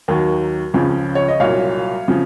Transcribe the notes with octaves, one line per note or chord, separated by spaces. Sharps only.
D#2 D#3 F#3
C#2 C#3 F3
C#5
D#5
C2 A#2 F#3 C#5 F5
C#3 F3